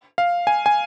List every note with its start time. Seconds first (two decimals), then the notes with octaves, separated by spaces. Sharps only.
0.18 F5
0.47 G#5
0.66 G#5